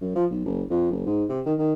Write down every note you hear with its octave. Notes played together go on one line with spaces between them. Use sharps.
F#2
F3
B1
F#1
F2
F#1
G#2
C3
D#3
D#3